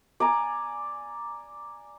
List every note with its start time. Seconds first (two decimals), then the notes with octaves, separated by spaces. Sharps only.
0.20 D5 G#5 A#5